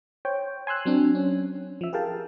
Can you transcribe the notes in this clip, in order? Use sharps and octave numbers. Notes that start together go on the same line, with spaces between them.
C5 C#5 G5
G#5 C6 E6 F#6
F#3 C4 D4
C#4
F3 E5
G4 G#4 A#4 F5 G5 A5